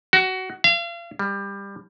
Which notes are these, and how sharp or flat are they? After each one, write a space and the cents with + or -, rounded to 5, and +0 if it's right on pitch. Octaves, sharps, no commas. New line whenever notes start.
F#4 +20
F5 -35
G3 +20